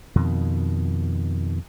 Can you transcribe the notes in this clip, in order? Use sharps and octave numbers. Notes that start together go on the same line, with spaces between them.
F2 B2 D#3